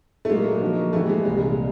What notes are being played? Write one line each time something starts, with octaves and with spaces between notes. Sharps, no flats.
A3
A#2 F#3 G#3 A#3
D3 F3 A#3 D#4 F#4
G#2 E3 G3 A3
G#3
C2 A#2 G3 G#3